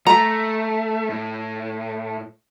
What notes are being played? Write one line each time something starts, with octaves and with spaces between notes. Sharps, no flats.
A3 A#5
A2